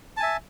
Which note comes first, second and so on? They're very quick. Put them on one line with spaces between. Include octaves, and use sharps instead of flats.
A5 G#5 E5